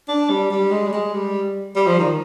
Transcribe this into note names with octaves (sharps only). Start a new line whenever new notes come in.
D4
G3
G3
G#3
G3
G#3
G3
G3
F3
D#3